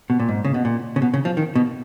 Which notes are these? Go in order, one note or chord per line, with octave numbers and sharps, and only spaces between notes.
B2
A#2
G#2
C#3
B2
A#2
C#3
B2
C#3
F3
D#3
B2